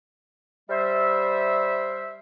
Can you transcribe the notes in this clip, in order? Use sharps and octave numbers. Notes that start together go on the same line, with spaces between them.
G3 C5 E5